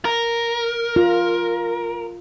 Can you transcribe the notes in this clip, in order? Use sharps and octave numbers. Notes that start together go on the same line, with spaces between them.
A#4
F4